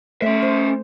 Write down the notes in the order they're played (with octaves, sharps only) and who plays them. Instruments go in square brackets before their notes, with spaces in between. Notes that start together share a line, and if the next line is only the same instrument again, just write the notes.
[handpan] A3 [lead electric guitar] C#4 E5
[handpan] C5